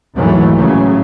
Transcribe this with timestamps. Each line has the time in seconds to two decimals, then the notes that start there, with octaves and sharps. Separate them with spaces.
0.15 D#2 G#2 E3 F#3 A3
0.56 A2 C#3 F#3